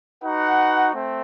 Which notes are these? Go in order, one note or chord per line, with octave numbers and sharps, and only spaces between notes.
D#4 F#4 B4 F#5
A3 C4